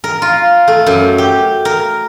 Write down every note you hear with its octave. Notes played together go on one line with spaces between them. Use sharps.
A#4
F4
A3
F#2
G4
A#4